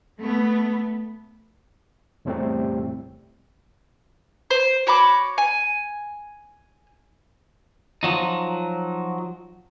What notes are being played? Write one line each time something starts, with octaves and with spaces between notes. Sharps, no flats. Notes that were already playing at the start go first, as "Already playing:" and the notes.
A3 B3
E2 A2 C3 G3 A3 C4
C5
F#4 C#5 B5 D6
G#5
F3 F#3 D#4